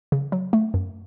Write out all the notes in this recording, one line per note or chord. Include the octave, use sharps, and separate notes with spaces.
C#3
F#3
A3
F#2